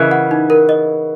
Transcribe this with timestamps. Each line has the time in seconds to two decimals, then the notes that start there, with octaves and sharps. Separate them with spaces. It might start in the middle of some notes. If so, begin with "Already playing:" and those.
Already playing: C#3 E3 A#4 D#5
0.11 F#5
0.31 D#4
0.50 A#4
0.69 D#5